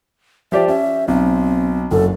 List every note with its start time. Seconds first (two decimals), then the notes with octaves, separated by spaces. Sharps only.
0.52 F3 G4 D5 E5
0.68 C#4 E5
1.08 B1 C4
1.91 F#1 F#2 A4